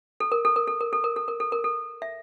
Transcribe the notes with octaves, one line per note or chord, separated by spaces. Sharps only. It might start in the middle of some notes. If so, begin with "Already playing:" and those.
A4
A#4
A4
A#4
A4
A#4
A4
A#4
A4
A#4
A4
A#4
A4
E5